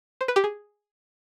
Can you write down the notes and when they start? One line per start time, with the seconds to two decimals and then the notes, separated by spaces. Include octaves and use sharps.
0.21 C5
0.28 B4
0.36 G4
0.44 G#4